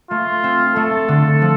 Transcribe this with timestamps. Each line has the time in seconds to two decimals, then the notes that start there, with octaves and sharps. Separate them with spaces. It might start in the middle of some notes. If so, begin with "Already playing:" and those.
0.11 A3 F4
0.44 C4
0.76 A3 A4
1.08 D3
1.42 F3